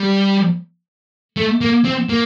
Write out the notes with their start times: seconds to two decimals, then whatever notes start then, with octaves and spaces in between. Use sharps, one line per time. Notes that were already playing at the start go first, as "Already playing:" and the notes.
Already playing: G3
1.37 A3
1.61 A#3
1.85 C4
2.09 A#3